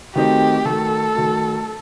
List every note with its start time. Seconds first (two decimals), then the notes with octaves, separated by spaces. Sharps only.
0.15 D#3 F#3 A3 C4 D#4 G4
0.65 D#3 F#3 A3 A4
1.15 D#3 F#3 A3